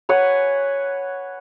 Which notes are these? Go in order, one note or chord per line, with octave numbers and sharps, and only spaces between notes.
B4 C#5 F#5 G#5